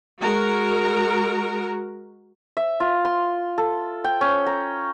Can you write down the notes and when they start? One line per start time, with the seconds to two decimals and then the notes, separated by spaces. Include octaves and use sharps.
0.20 G#3 F#4 A#4 A#5
2.57 E5
2.80 F4
3.05 C6
3.58 A4
4.04 G5
4.21 C#4
4.46 A#5